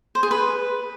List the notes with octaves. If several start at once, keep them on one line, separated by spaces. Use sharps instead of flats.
C5
G#4
B4